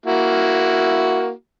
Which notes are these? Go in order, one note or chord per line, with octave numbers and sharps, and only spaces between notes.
A#3 E4 F#4